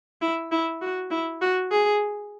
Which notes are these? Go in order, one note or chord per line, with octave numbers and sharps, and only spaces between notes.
E4
E4
F#4
E4
F#4
G#4